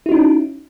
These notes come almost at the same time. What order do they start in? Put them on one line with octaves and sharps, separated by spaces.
E4 F#4 D#4 C#4